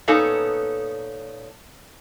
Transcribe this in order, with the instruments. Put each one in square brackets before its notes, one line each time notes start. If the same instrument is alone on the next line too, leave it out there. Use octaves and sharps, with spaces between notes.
[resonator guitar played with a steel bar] A#2 B3 C#4 D#4 A4